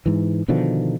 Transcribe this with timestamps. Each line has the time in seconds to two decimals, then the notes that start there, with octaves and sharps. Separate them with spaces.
0.06 G#2 E3
0.48 B2 D3 D#3 F3